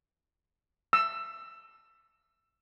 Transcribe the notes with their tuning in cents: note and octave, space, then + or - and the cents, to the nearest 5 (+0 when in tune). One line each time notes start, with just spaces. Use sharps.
E6 +15